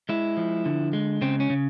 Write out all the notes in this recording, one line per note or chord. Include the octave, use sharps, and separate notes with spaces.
G#3 E4
F3
D3
G#3
C#3 C4
C#4
C#3